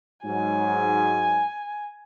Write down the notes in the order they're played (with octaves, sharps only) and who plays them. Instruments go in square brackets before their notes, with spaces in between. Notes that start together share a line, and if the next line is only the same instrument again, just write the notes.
[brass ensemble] G#2 F#3 [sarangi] G#5